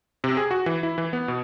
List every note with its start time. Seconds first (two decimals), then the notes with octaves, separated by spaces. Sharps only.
0.24 C3
0.37 G#4
0.51 F#4
0.66 E3
0.83 E4
0.98 E3
1.13 B3
1.28 B2